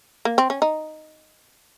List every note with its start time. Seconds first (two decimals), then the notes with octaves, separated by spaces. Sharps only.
0.25 A#3
0.38 C4
0.50 C#4
0.62 D#4